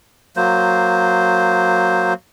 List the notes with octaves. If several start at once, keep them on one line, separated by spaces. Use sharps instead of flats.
F#3 A#3 C5